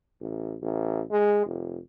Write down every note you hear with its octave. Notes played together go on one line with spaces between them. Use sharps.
A1
A1
G#3
F1